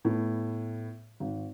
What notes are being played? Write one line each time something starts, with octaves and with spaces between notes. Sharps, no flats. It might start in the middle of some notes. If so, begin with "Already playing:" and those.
A2 B3
G#1